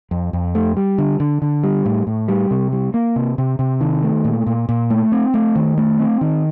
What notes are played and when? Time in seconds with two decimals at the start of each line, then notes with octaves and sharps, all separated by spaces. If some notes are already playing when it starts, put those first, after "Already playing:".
0.11 F2
0.33 F2
0.55 A3
0.77 G3
0.98 D3
1.20 D3
1.42 D3
1.64 G3
1.86 A2
2.07 A2
2.28 G3
2.51 C3
2.72 G3
2.94 A#3
3.16 C3
3.38 C3
3.59 C3
3.81 D#3
4.03 A3
4.25 A#2
4.47 A#2
4.69 A#2
4.90 A3
5.12 C4
5.34 A3
5.56 D#3
5.78 A3
5.99 C4
6.21 D#3